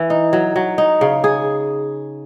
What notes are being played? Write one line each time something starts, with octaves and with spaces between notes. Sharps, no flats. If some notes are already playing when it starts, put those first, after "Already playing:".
Already playing: E3
D#4
F#3
F#3
D#4
C#3
G#4